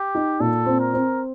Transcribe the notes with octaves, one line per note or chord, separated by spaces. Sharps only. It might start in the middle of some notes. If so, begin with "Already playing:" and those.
Already playing: G4
D#4
A#2 A4
C4
A#4
C4